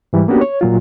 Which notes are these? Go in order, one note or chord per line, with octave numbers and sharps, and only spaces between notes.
G#2 E3 G3
A#3 B3 C#4 D4 F#4 G4
C#5
A#2 F#3 F4